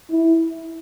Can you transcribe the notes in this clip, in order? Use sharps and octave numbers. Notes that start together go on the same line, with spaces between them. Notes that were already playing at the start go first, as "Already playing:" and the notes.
E4